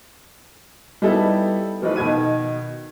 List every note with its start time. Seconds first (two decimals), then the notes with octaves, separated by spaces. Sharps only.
1.02 G3 B3 D#4 E4 A4
1.82 E3 F3 A3 D#4 B4
1.96 B2 D#3 G#6 D#7